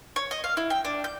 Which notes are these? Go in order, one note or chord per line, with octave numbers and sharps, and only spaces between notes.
C#5
D#5
F5
E4
G5
D4
G6